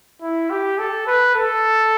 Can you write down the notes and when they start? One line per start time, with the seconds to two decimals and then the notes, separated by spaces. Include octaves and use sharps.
0.22 E4
0.50 G4
0.78 A4
1.07 B4
1.35 A4